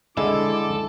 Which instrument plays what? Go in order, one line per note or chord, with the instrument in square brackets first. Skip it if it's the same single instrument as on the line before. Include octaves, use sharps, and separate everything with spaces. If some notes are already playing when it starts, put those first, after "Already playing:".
[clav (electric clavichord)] D3 G#3 E4 [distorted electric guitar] A4 [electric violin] D6